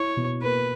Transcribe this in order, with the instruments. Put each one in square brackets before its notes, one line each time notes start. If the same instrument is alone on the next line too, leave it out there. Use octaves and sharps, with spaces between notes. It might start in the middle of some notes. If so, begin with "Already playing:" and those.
Already playing: [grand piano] E4 [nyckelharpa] C#5
[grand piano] B2
[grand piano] A#3 [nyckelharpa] B4